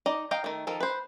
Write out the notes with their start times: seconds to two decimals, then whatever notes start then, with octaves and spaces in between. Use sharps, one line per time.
0.06 D#4 D5 D#5
0.31 D#5 F5 G5 A#5
0.44 D#3 A3
0.67 D#3 F3 A4
0.80 B4 C5